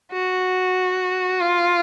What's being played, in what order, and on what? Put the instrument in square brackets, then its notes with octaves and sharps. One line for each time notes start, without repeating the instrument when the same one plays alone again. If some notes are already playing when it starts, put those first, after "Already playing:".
[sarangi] F#4
F4